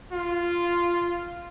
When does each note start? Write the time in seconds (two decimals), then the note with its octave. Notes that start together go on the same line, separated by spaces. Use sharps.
0.13 F4